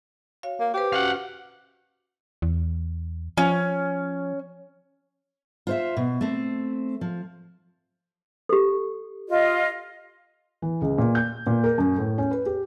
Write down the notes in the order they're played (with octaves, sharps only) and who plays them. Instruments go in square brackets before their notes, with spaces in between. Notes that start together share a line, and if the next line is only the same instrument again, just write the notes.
[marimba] F#4 C#5 F5
[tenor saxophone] A#3
[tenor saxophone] G4 [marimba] B4 C5 G5
[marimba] C#4 F#4 [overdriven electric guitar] F5 F#5
[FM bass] E2
[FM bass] F3 [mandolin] C#4
[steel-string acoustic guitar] F4 C5 E5
B2
A3 C4
F3
[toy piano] G4 A4
[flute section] F4 D#5
[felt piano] E3
C#2
A#2
G6
A#2
A#4
F#2
A2
C#4
B4
G4